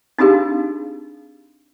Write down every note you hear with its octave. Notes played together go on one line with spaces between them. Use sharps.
C4 D4 D#4 G4 G#4 F5